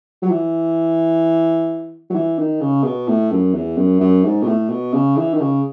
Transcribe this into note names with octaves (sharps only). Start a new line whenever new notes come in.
F#3
E3
F#3
E3
D#3
C#3
B2
A2
F#2
E2
F#2
F#2
G#2
B2
A2
B2
C#3
E3
D#3
C#3